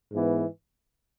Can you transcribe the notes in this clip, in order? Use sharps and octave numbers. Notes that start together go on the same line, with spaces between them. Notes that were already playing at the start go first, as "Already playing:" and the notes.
G#2 E3 B3